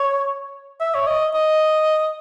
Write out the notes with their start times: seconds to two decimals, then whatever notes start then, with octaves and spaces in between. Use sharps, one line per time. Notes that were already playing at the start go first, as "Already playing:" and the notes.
Already playing: C#5
0.80 E5
0.95 C#5
1.07 D#5
1.34 D#5